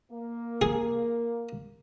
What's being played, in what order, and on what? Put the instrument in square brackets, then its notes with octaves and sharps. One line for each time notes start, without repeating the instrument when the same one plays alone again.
[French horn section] A#3
[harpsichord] G#4